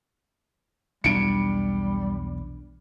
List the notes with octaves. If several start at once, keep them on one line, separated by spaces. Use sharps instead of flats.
B1 E2 G3 D4 C#7 D7